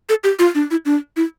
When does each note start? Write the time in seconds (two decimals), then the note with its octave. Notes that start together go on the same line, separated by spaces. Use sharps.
0.09 A4
0.24 G4
0.39 F4
0.55 D4
0.71 E4
0.85 D4
1.16 E4